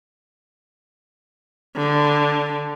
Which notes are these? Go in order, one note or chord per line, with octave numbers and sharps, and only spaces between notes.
D3